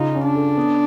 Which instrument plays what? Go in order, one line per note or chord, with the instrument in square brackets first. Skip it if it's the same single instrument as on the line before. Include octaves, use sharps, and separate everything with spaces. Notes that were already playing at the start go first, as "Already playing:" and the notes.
Already playing: [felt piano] C#3 F4 [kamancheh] D#4
[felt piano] C#4
[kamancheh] D4
[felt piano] A4
B3